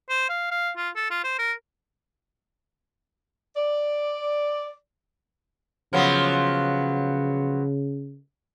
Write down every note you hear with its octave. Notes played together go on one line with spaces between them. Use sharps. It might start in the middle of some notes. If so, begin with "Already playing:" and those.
C5
F5
F5
F4
A4
F4
C5
A#4
D5
C#3 F3 F#3 B3